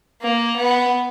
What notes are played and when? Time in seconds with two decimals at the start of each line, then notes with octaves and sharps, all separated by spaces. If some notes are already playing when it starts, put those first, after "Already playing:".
0.22 A#3
0.56 B3